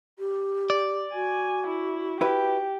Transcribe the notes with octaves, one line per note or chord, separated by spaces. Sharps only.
G4
D5
F#4 G#5
E4
E4 G4 B4